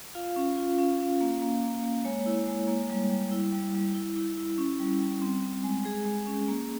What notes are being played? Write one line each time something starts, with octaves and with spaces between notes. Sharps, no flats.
F4 F5
C#4
F4
C#4 F5
C#4
A#3
A#3
A#3
A#3
G#3 C#5
E4
G#3
A#3
G3
G3
E4
G3
G3
E4
E4
E4
C#4
G3
G3
C4
C4
G#3
G#3 G#4
G#3
C#4
A#3